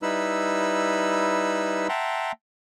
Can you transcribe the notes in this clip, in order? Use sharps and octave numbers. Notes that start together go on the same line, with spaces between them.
G3 D#4 E4 B4 B5 E6
E5 F#5 G5 A5 A#5 C6